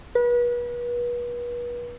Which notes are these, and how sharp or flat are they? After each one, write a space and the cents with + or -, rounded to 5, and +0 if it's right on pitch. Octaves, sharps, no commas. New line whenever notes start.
B4 -35